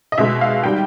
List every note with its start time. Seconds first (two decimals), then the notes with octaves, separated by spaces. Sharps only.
0.12 D#5
0.18 B2 G#3 E5
0.41 F5
0.64 D#3 G3 G5